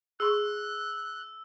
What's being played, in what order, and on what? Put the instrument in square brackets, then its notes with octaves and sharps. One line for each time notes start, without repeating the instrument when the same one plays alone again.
[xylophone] G#4 C6 C#6 [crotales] E6 [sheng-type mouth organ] F#6